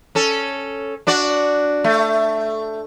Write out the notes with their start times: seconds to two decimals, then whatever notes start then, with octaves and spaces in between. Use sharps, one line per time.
0.15 C#4 A4
1.07 D4 F#4 D5
1.84 A3